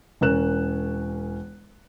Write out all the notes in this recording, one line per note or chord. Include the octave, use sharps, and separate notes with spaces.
E1 C#4 A#4 F#6 E7